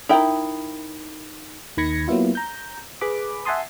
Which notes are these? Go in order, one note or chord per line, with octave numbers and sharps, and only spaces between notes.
D#4 E4 A#4 E5 G5 A#5
D#2 D#3 B5 G#6 A#6 C#7
F#3 A#3 B3 E4 F4
A#5 G6
G#4 B4 B5 D6
E5 F#5 G#5 A5 C6 D#6